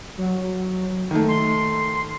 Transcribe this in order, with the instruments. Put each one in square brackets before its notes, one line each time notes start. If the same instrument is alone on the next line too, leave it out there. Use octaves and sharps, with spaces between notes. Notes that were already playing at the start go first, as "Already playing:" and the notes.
[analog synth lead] F#3
[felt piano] D#3 A3
[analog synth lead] C6